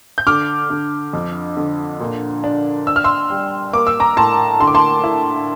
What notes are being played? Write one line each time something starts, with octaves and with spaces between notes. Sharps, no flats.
G6
D3 D6 F6
D3
F2
D3
A#2
D4
D4 E6
F6
C6 E6
G3
A#3 D6
E6
A#5 D6
A2 A5 C6
D3 C6
D6
A5 C6
E4